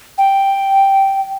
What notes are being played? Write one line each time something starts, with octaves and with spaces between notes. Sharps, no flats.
G5